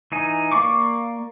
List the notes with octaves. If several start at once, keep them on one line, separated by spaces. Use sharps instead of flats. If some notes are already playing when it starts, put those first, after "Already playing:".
E3 D#4 G#5
A#3 D5 F5 C#6 D6